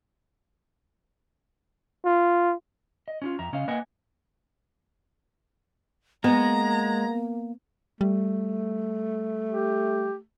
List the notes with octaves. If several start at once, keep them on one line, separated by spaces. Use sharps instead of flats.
F4
D#5
C#4 E4 F4
F2 E5 A#5
C#3 C#4 D#5 F5
A#3 B4 D#5 E5 F#5 G#5
G#3 A#3 B3 A#5
G3 A3
G4